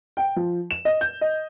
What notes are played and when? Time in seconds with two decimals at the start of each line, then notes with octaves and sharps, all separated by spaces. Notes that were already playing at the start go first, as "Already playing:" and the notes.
0.17 G5
0.36 F3
0.71 E7
0.85 D#5
1.01 G6
1.21 D#5